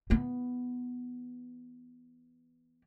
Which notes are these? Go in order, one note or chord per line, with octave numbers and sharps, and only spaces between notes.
E3 B3